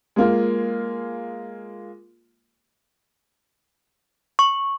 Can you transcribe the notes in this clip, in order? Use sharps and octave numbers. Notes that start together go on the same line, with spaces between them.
G#3 A#3 F4
C#6